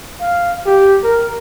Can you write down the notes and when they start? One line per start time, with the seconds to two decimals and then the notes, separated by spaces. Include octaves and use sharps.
0.20 F5
0.66 G4
1.03 A#4